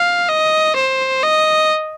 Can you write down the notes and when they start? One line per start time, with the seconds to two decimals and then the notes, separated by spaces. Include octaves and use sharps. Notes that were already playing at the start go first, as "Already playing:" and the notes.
Already playing: F5
0.29 D#5
0.76 C5
1.23 D#5